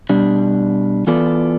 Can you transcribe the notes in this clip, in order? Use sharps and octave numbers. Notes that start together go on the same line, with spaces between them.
B2 G3 D4
E3 B3 F4 A4 D5